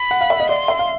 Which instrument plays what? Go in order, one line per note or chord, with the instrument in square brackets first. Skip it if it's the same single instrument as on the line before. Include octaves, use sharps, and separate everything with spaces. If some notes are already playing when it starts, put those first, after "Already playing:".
Already playing: [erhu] B5
[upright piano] F#5
F5
E5
D#5
[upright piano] D5 [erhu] C6
[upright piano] E5
F5